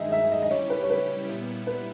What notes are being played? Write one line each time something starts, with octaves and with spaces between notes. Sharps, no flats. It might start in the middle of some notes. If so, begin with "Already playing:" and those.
Already playing: G2 D#3 G#3 D#4 G#4 D#5 E5
E5
D#5
D#5
C#3 G3 C#4 E4 G4 C#5
B4
C#5
B4
A#2 G3 B3 E4
B4